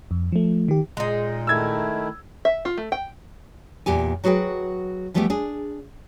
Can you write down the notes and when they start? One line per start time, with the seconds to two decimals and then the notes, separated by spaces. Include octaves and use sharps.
0.11 F2
0.32 F3 A3
0.68 D#3 G4
0.97 A#2 G#3 D#4
1.47 D#3 A3 E4 E6 G#6
2.45 E5
2.65 F4
2.77 A3
2.92 G5
3.86 E2 A#2 G4 G#5
4.24 F#3 F#4 G#4 B4 G5
5.14 E3 F3 G3 A3 B3 G4
5.30 D4 G#4